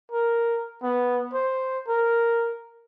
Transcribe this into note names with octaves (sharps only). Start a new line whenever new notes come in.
A#4
B3
C5
A#4